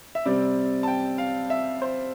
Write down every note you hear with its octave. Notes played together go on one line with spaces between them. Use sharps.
E5
C3 G3 C4 D5
A5
G5
F5
E5
C5